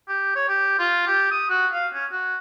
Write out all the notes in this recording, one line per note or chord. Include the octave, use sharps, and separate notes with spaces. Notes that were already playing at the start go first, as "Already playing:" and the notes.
G4
C#5
G4
F4
G4
D#6
F#4
F5
C#4
F#4